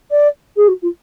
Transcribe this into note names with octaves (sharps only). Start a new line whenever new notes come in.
D5
G#4
F#4
F4